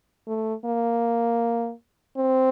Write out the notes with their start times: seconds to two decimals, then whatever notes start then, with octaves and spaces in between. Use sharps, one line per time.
0.27 A3
0.65 A#3
2.18 C4